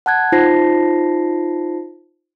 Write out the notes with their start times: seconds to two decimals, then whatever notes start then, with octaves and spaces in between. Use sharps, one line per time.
0.06 F#5 A5 F#6 G#6
0.32 D#4 F4 C5 A5 A#6 C7